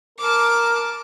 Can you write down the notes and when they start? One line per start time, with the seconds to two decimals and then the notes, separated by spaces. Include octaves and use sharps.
0.19 A#4 A5 D6